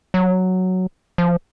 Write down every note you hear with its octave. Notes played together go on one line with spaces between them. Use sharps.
F#3
F3